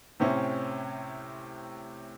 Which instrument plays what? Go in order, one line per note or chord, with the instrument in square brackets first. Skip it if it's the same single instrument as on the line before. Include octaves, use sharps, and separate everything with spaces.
[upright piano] A2 C3 C4 C#4 E4